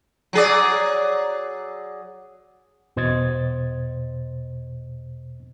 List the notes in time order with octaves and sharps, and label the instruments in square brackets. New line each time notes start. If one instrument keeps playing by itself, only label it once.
[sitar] F#3 G#4 D5
[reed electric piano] E2 B2 C5 D#5 G#6 A6